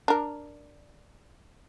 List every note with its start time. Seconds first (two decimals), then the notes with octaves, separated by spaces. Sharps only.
0.08 D4 A#4